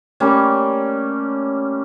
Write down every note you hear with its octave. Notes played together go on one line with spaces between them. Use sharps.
G3 A3 A#3 C#4